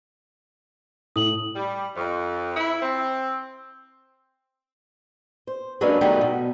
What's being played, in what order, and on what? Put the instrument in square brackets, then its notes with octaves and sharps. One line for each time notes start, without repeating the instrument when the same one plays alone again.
[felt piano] A2 [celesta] D#6 F#7
[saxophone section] G3
F2
E4
C4
[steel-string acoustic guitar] C5
F#3 G#3 A#3 C#4 D4 B4
D#3 F#3 G3 A3 B3 D#4
B2